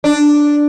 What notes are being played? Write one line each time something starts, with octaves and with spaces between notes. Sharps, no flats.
D4